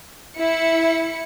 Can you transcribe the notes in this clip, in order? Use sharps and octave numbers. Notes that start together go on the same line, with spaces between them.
E4 C#7